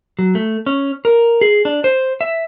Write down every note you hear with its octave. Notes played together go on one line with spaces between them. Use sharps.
F#3
A3
C#4
A#4
G#4
D4
C5
E5